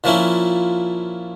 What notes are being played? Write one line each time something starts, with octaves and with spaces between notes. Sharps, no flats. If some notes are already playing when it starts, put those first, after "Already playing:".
A#2 F3 A#3 C#4 E4